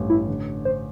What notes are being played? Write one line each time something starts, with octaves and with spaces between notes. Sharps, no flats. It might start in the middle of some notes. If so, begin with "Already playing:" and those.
Already playing: A1 G2
E4
D3
D3 C5